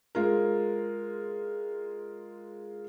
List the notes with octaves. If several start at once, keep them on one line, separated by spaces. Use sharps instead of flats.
G#3 F4 A#4